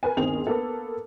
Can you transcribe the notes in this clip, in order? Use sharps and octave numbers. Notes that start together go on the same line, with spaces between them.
A#4 B4 G#5
G1 D#2 C4 G#4 A#4 F7
A#3 B3 A4